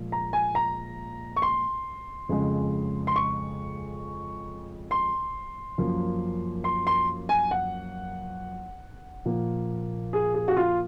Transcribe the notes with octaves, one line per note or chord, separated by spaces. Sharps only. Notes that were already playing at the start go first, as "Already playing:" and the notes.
Already playing: A#2 F3 G#3
A#5
G#5
A#5
C#6
C6
F2 C#3 G#3
C6
C#6
C6
F#2 F3 A#3
C6
C6
G#5
F#5
A#2 F3 A#3
G#4
G#4
F#4
F4